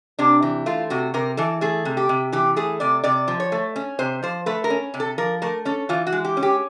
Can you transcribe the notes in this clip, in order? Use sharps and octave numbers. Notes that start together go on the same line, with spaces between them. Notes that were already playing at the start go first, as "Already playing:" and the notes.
C3 D4
E3
A3 F4
C3 F#4
C3 A#4
E3 A4
A3 G#4
C3
G4
C3
E3 G4
A3 G#4
C3 D5
C3 D5
F3
C#5
A3
C#4
C3 C5
F3 C5
A3 B4
A#4
C#4
C3
A4
F3 A#4
A3 A#4
C#4 A4
E3 F4
F#4
G#3
G4
C#4
G4